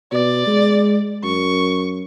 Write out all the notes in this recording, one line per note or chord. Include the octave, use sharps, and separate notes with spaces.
B2 D5
G#3
F#2 C#6